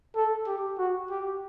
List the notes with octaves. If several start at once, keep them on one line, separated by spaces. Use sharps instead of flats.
A4
G4
F#4
G4